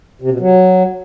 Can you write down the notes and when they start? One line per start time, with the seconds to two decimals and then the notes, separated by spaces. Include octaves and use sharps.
0.21 C3
0.31 B2
0.40 F#3